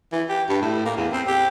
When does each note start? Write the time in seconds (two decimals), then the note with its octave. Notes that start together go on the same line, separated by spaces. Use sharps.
0.12 E3
0.29 G4
0.49 G2
0.62 A2
0.85 A#3
0.97 E2
1.13 C4
1.27 G4